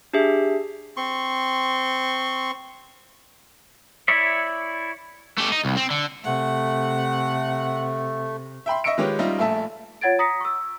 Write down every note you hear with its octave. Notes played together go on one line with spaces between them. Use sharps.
D4 G4 G#4 E5
C4 C6 C#6
E4 C#5 D5 E5
A3 G4
D#4
C2
C4
D3
C3 A3 F#5
E5 G5 B5 C6
D#5 E5 C#6 E6 C#7 D7
D#3 G#3 F4 G4 B4 C#5
G3 C#4 D#4 F4 E5
A#1 A3 E5 A5
F4 C#5 F#5 G#6 A6 D7
A#5 D#6 A#6 B6 C#7
C#6 E6